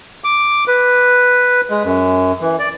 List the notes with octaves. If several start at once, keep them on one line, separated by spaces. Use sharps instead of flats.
D6
B4
G#3
F#2
E3
D5